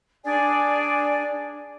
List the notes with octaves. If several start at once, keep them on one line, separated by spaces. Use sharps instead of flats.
D4 G#4 D5 G#5